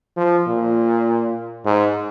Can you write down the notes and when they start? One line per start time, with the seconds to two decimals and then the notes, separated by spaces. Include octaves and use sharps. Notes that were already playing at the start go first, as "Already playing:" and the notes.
0.17 F3
0.47 A#2
1.65 G#2